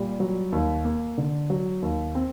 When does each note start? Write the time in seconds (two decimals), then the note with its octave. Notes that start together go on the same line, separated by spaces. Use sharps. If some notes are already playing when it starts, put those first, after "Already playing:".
Already playing: A#2 G3
0.20 F#3
0.52 D#2
0.85 A#3
1.18 D3
1.50 F#3
1.82 D#2
2.15 C4